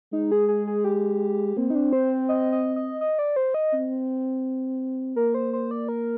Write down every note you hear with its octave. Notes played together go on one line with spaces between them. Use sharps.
G#3 D#4
G#4
G#4
G#4
G4
A#3 C4
D#4
D4
C5
D#5
D#5
D#5
D#5
D5
C5
D#5
C4
A#3 A#4
C5
C5
D5
A#4